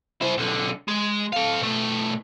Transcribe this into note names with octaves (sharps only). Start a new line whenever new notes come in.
E4 C5
B1 D3
G#3
A4 F5
B2 A3